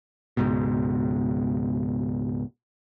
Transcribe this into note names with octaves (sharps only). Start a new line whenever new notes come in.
C#2 G#2 B2